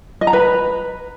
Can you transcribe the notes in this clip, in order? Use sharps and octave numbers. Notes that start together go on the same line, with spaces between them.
D#5
A#5
B4